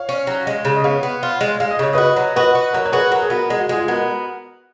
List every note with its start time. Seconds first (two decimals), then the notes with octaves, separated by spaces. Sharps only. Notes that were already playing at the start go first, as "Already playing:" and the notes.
Already playing: C#5 F5
0.09 C#4
0.27 F#3
0.47 G#3
0.65 C#3
0.76 D#5
0.84 B3 C#5 F5
1.03 B3
1.23 F4
1.41 G#3
1.60 G#3 F5
1.71 D#5
1.79 C#3 C#5
1.93 F#4 B4 D#5
2.16 F#3
2.36 F#4 B4 D#5
2.55 F#4
2.73 F#3 A#4 C#5
2.86 C#5
2.92 F#4 G#4 B4
3.11 F#3 A#4
3.22 G#4
3.30 B3 F#4 A#4
3.49 G#3 G#4
3.60 F#4
3.69 G#3 F4 G#4
3.81 G#4
3.88 B3 F#4 A#4